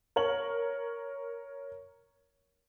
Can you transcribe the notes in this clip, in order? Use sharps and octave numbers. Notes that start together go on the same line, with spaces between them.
A#4 C#5 F#7